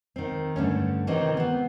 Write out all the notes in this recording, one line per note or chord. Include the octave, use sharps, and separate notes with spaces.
D#3 C4
G2 D3 A3 C#4
C3 D#3 E3 C4 D#4
B3 C4